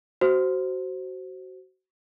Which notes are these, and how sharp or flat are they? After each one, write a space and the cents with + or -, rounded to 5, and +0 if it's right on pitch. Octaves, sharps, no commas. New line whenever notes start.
F#4 +20 C5 +0